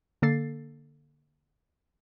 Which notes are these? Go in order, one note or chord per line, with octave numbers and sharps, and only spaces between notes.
D3 A#3 A4 A6 C7